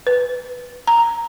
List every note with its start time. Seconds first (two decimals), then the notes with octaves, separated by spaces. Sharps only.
0.07 B4
0.87 A#5